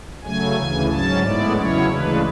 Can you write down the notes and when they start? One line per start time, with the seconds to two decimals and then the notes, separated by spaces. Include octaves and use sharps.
0.24 C#3 F#3 A3 G#5
0.57 D2 C#3 E3
0.90 G#2 F#3 C#4 A5
1.23 A2 G#3 B3 E4 D5
1.56 E2 C#3 F#3 C#4 E4 C#5
1.89 D2 C#3 E3 G#3 D4 B4